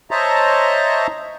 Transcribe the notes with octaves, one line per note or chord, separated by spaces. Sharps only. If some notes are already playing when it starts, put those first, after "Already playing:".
C5 C#5 D#5 E5 A5 A#5